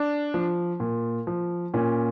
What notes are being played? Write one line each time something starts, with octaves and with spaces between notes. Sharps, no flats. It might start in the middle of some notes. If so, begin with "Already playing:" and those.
Already playing: D4
F3
A#2
F3
A#2 C#4